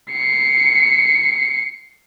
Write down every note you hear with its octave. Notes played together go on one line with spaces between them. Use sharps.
C7 C#7